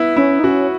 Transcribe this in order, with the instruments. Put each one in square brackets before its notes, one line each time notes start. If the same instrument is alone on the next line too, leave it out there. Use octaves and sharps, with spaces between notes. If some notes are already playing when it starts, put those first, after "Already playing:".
Already playing: [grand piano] B3 E4
[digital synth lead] C#4 [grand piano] E4
[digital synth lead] D#4
[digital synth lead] C#4 [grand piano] F#4